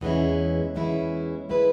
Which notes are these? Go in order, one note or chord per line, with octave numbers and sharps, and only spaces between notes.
E2 E3 G#3 C#4 E4
E2 E3 G#3 C#4 E4
G#3 E4 B4